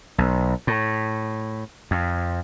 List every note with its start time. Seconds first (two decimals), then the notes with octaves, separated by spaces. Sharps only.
0.18 B1
0.67 A2
1.91 F2